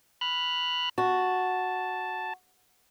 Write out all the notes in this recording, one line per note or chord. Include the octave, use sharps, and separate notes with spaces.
B5 F6 F#6
F#4 A5